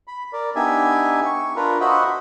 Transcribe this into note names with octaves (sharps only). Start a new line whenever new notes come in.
B5
A#4 D5
B3 D4 D#4 G4 E5 G#5
C#6
D4 F4 A#4 B4
F#4 C5 D#5 E5 F#5 B5